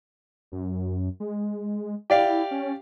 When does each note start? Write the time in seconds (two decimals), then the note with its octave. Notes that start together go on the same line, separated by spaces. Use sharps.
0.52 F#2
1.20 G#3
2.10 E4 G4 D5 F5
2.51 C#4